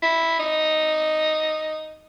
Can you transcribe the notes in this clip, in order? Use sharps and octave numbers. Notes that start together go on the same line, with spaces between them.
E4
D#4